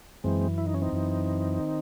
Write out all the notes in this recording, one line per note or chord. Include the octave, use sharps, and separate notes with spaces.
F#2 E3 G#3 C4
E4
D#4
C#4
C4 D#4
F#2 E3
D#3